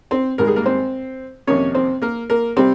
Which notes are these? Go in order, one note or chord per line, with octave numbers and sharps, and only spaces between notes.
C4 C5
G#2 D#3 G3 A#4
G#4
A#3 A#4
C4 C5
F2 C3 D#3 A#3 C#4 C#5
C4 C5
A#3 A#4
A#3 A#4
C3 G3 C4 C5